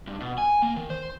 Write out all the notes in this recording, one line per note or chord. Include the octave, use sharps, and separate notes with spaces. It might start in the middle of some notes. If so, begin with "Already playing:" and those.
G2
B2
G#5
A#3
D#3
C5